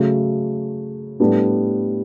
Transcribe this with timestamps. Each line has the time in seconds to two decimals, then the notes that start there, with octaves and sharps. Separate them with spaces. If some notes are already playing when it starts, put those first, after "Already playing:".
Already playing: C#3 F#3 A3
1.20 A2 G3 B3 D4 A4